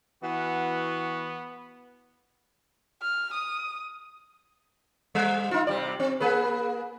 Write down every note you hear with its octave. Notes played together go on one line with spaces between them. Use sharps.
E3 B3 F#4
F6
D#6
G3
D#4 F4
C3 G3 D5
C4
A#3 G#4 B4